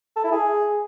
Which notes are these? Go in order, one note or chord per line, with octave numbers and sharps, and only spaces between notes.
A4
E4
G#4